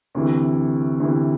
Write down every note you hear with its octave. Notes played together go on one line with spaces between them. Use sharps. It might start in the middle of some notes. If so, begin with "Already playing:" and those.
D2 C3 E3
D2 C3 E3